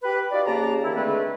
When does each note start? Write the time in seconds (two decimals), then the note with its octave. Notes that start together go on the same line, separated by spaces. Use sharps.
0.03 G4 B4
0.32 D#4 F4 F#4 D5
0.46 F2 C#3 A#3 G4 A5 A#5
0.84 D#3 E4
0.96 D3 G#3 A3 C4 B4